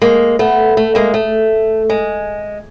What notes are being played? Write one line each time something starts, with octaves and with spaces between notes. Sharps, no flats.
G#3 A#3
A3 B3
A3
G#3 A#3
A3
G#3